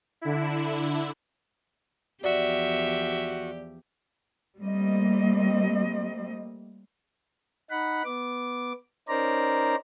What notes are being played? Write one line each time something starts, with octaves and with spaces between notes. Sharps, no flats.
D3 E4
E2 F3 F#4 G4 D5 E5
G3 A3 A#3 C4 D#5
D#4 F#5 B5
B3 D6
C#4 D#4 A#4 C5 D5 A#5